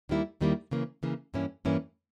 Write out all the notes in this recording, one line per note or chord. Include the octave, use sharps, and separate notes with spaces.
D#2 D#3 G3 A#3 E4
D#2 D#3 G3 A#3 E4
C#3 E3 A#3
C#3 E3 A#3
G2 E3 A#3 C#4 E4
G2 E3 A#3 C#4 E4